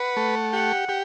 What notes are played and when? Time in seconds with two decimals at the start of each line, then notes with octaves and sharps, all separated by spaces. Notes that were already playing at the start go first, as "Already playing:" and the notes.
Already playing: B4 F#5
0.17 A3
0.53 G4 F#5
0.89 G4